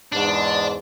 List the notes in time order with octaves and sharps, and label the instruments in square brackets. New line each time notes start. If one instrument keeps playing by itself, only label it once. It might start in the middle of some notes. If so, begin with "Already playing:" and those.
[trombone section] E2 G#2 [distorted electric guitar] D4